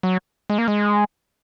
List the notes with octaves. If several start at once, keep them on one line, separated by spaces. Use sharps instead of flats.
F#3
G#3
A#3
G#3